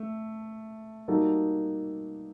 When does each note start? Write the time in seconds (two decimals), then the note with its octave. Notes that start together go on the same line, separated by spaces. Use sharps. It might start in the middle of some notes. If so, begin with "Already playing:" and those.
Already playing: A3
1.08 G3 A#3 D#4 F#4 A4